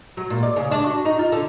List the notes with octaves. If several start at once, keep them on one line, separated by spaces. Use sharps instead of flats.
F#3
A#2
D5
C#3
D4
F#4
D#4
F4
D3